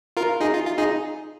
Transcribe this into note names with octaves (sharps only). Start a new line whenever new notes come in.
F4 A#4
D#4 G#4
F4
F4
D#4 G#4